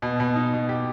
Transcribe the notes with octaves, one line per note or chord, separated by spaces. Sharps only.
B2
B2
D#4
B2
G4